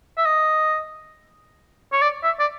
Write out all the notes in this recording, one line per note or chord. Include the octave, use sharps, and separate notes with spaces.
E5
D#5
C#5
D5
E5
D5